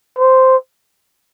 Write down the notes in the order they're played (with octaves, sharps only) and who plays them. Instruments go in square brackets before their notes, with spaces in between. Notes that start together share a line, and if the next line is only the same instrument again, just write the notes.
[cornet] C5